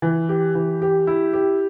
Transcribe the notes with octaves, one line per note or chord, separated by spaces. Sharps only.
E3
G4
E3
G4
E4
G4